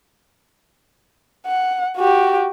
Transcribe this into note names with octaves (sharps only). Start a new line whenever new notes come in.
F#5
F#4 G4